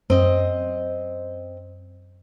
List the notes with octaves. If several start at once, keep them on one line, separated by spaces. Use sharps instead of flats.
F#2 C4 D#5